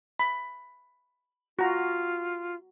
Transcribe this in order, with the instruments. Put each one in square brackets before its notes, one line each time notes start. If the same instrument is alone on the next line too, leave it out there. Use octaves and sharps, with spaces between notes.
[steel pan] B5
[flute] F4 [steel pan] F#4 A#5